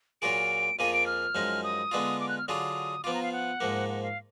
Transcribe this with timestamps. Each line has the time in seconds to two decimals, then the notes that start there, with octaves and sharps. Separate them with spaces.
0.22 A#2 F#3 A#3 F4 G#4 D7
0.79 F2 F3 A#3 F4 G#4 D#7
0.93 D7
1.06 F6
1.35 F#2 F3 G#3 D#4
1.63 D#6
1.91 D3 G#3 B3 D4 F4
2.20 D6
2.29 F#6
2.38 F6
2.48 D3 F#3 D4 F4 G#4 D#6
3.04 F3 B3 F4 D6
3.14 A#5
3.23 F5
3.32 F#5
3.61 G#2 F3 A#3
3.89 F#5
4.03 F5